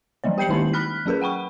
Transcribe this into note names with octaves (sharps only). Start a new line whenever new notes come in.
E3 F#3 G3 B3 C#5
G4 G5 G6 C7 C#7 F#7
D#3 G#3 A#3 C#4 D#4 E4
B5 F6 F#6 B6
F#3 C#4 G#4 A#4 B4
F#5 G5 B5 C#6